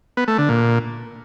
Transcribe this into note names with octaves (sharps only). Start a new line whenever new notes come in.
B3
A3
D3
A#2